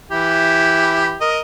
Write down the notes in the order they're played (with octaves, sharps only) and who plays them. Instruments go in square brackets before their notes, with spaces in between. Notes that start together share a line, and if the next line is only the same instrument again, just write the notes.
[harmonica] E3 E4 G4
A#4 D#5